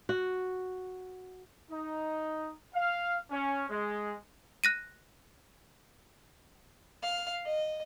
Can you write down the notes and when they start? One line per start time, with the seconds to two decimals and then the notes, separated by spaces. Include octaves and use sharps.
0.09 F#4
1.71 D#4
2.75 F5
3.31 C#4
3.70 G#3
4.64 F#6 A#6 D#7
7.02 F5
7.46 D#5